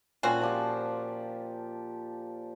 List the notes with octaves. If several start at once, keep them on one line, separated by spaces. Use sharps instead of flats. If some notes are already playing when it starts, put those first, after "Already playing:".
A#2 C4 C#4 F#4 G#5 A5
F3 G4 F5